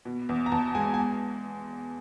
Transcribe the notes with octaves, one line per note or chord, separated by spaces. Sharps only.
B2
E2
A#5
E2 A5
G#3 G#5
G#5